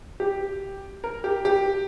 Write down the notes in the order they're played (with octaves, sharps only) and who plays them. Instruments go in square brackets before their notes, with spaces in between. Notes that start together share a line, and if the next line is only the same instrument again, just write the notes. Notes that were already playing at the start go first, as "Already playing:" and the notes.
[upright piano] G4
A#4
G4
G4